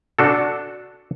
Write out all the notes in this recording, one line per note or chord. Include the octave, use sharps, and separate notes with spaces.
D4 F#4 A4